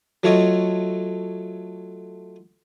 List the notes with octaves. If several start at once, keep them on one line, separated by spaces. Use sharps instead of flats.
F#3 A3 F4 C#5 D#5